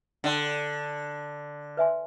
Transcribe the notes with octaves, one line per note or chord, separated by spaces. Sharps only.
D3 A4 D5 G5 C6
B4 E5 G#5 C6